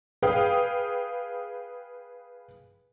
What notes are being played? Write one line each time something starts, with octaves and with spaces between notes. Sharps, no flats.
G#4 B4 F5 G5